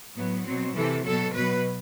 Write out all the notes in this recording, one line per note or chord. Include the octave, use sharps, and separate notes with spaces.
A2 F#3 B3
B2 F#3 C4
C3 E3 A4
B2 F#3 A4
B2 F#3 B4